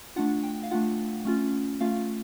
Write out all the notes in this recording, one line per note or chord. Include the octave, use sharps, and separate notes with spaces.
A3 D4 F4 F#5
G5
F5
A3 D4 F4 F#5
A3 C#4 F4
A3 C#4 F4 F5